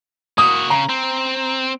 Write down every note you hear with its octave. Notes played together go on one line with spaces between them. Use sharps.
A#3 F#4 D#6
C#3 A#5
C4